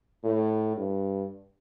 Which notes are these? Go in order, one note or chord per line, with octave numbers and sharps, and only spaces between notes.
A2
G2